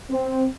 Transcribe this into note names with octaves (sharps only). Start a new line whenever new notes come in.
C4